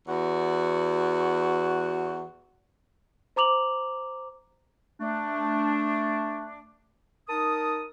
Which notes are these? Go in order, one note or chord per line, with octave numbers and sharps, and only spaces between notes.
E2 F#4
C5 A#5 D6 F7 F#7
A3 D4
D#4 A#4 A5 D#6